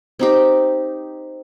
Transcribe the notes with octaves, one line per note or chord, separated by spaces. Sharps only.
C4 D#4 G4